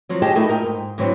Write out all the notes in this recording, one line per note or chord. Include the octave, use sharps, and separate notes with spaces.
F3 F#3 C4
G4 G#4 D#5 G5 A5
A3 D#4 E4 F#4 A4 A#4
A#2 A#4 D#5 G5
G#2
G#2 E3 F#3 C4 D4